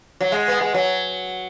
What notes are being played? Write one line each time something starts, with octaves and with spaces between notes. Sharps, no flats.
F#3
G#3
B3
G#3
F#3